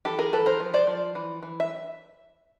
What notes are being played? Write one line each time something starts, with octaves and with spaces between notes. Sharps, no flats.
E3 G4 A4
G#4 A#4
E3 A4 B4
A#4 C5
F3
C5 D5
F3
E3
E3
E5